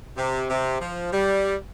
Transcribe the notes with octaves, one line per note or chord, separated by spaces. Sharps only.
C3
C3
F3
G3